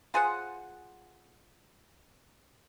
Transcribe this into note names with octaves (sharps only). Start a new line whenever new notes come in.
F4 G#4 C5 F#5